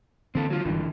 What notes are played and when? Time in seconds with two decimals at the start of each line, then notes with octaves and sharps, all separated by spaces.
0.35 D3 E3 A#3 C4 A4
0.50 F#3 F4
0.65 G#1 G2 D3 E3 G3